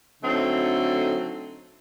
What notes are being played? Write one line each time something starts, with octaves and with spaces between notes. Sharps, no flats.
D3 F#3 A3 C4 D#4